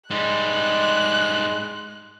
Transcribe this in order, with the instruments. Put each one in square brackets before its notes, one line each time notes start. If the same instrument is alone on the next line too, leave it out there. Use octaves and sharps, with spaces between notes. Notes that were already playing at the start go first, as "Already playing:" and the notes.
[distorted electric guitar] G#2 G3 [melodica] G#3 [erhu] F#6